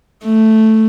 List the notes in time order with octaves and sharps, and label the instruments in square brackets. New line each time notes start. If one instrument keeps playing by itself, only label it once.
[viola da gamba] A3